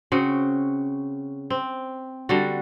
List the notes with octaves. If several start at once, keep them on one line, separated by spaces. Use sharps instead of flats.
C#3 C4 F#4
C4
D3 G3 F#4